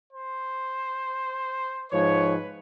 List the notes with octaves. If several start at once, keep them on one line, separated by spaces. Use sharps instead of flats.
C5
G#2 F3 B4 C#5